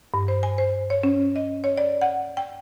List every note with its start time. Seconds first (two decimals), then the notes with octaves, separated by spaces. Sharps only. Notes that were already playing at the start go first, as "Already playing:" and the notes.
0.14 G2
0.28 C5
0.43 G#5
0.58 C5
0.90 C#5
1.03 C#4
1.36 D#5
1.64 C#5
1.77 D5
2.01 F#5
2.37 G5